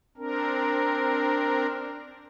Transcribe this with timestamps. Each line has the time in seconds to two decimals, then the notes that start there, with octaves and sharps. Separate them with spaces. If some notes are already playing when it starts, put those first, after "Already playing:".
0.17 C4 D4 A#4